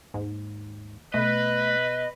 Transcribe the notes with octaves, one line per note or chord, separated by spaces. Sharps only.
D#2 G#2
B2 A3 B4 D#5